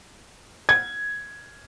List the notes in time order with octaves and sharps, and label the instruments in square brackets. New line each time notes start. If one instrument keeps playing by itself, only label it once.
[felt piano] G#6